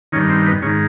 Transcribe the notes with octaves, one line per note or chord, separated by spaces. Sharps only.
G2 D#3 C#4
C4
B3
G#2 D#3 C#4